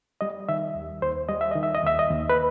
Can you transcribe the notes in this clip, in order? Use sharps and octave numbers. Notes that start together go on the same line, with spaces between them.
G3 D#5
D#3 E5
D#2
D#2 C5
G3 D#5
E5
D#3 D#5
E5
D#5
D#2 E5
D#5
D#2
B4